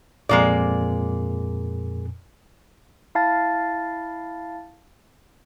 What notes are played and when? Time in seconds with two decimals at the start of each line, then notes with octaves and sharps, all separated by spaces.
0.29 F2 A#2 G#3 A#3 D5
3.15 E4 F5 A5 A6